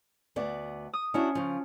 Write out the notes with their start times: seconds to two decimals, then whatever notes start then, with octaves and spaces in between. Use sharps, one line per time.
0.36 D2 B3 D5
0.93 D#6
1.14 C#4 D4 E4 F#4
1.35 C#3 F3